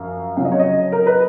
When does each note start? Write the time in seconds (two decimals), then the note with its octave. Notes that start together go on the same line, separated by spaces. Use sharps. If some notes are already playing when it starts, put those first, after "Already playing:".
Already playing: F#2 F3 F5
0.37 F2 C#3 F#3 C#4 F5
0.45 D#5
0.52 C#5
0.59 D#5
0.92 A#4
1.07 B4